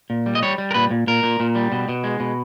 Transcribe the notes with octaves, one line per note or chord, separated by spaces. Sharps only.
A#2
G3
D#5
G3 C#5
G3
A#4
A#2 B4
A#2
A#2 A#4
A#2
A#2
G3
B2
B2
G#3
B2